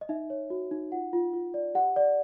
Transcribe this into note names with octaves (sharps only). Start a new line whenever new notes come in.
D#5
D#4 E5
C#5
F#4
D#4
F4 F#5
F4
F4
D5
G4 F#5
D5